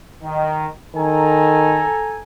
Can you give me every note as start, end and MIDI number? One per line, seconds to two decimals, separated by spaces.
0.23 0.67 51
0.95 1.86 51
0.95 2.20 69
0.95 2.20 80
0.95 2.20 82